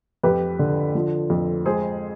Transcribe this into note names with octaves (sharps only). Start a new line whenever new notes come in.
F2 G4 B4
D3
F3
F2
G#3 G#4 C5